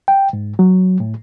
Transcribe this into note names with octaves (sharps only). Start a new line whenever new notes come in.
G5
G#2
F#3
A2